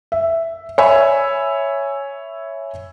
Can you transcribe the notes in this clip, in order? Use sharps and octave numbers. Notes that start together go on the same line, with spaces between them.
E5
C#5 E5 G#5 B5 E6